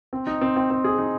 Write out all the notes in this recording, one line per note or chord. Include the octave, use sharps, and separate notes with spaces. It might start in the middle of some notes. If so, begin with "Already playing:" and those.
C4
D#4
C4
C4
C4
G#4
D#4